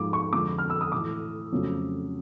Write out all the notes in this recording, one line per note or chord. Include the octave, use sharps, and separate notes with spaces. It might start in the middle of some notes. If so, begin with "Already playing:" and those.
Already playing: G#2 F3 G#3 D6
C#6
F2 D3 F3 G#3 D6
F6
E6
D#6
A2 E3 A3 D6
F2 C#3 F#3 A3